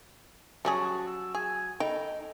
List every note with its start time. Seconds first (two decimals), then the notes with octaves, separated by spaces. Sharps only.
0.65 F#3 G3 C#4 G#4 A5
1.07 E6
1.35 G#4 G#5
1.80 D#4 A4 G5